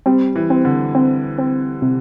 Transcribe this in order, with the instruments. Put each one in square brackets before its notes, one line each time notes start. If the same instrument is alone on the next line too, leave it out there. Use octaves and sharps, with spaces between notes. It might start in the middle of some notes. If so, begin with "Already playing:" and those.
[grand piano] G3 [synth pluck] C4
[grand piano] E3
[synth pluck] C4
[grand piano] D3
[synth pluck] C4
C4
C3